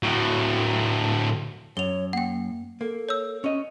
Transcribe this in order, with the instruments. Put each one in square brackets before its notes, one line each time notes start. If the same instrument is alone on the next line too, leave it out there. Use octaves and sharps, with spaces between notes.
[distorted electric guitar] A2 F#3
[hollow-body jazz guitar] F#2 [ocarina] C#5 [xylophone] F7 G7
[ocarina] A#3 [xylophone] F#5 G5
[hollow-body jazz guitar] A#3 [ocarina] A4
[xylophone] C#5 E6
[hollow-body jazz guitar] C#4 D#5